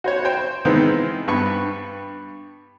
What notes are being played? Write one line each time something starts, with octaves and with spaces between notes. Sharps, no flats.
F#4 C5 C#5
C5 G5
D#3 E3 G#3 B3 C4 D#4
G2 B3 B4 C#6